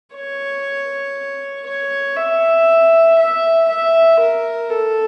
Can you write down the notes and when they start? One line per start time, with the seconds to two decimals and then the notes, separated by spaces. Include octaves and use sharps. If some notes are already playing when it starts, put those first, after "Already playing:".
0.14 C#5
1.66 C#5
2.17 E5
3.18 E5
3.68 E5
4.19 A#4
4.70 A4